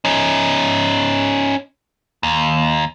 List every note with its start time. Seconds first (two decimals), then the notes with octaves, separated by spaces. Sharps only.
0.05 C#4 D#4
2.23 D#2